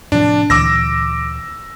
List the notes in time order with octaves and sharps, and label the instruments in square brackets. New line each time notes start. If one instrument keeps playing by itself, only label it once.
[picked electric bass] A2 C3 F3 [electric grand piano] D4
[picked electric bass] D2 A#2 E3 [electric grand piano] D6 E6 A#6